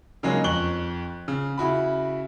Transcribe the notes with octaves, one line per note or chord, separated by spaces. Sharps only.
C#3 F#3 G#3 A#3 C#4 D#4
F2 C#6 F#6 F#7 G7
C#3
C#3 E4 F#4 B5